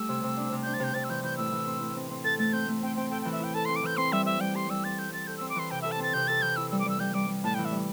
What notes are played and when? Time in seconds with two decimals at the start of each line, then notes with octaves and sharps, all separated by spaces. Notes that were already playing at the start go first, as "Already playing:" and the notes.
Already playing: G3 A3 G4 E6
0.09 C3
0.23 C3
0.37 D4
0.52 C3
0.63 D4 G6
0.74 A6
0.80 C3 G6
0.94 C3 A6
1.04 E6
1.09 E3 G6
1.23 E3 G6
1.37 A2 E6
1.52 E3
1.66 C4
1.81 A2
1.96 C4
2.11 C4
2.24 A4 A6
2.39 A3 A6
2.53 C4 G6
2.68 A3
2.83 C4 G5
2.96 C4 G5
3.10 A4 G5
3.22 E3 G5
3.32 E5
3.40 E4 G5
3.54 A4 A5
3.65 C4 C6
3.76 D6
3.83 E3 G6
3.97 C4 C6
4.12 G3 E5
4.26 G4 E5
4.40 G3 G5
4.55 G4 C6
4.70 G3 E6
4.84 C4 A6
4.98 A4 G6
5.12 C4 A6
5.27 A4 G6
5.37 C4 E6
5.49 D6
5.56 E3 C6
5.71 C3 G5
5.82 A4 E5
5.91 A5
5.99 C4 A6
6.14 C3 G6
6.28 A4 A6
6.42 E3 G6
6.56 E4 E6
6.71 G3 E6
6.79 D6
6.86 G3 E6
7.00 G3 G6
7.14 G3 D6
7.29 G3
7.44 A2 A5
7.54 E3 G5
7.65 E5
7.72 G3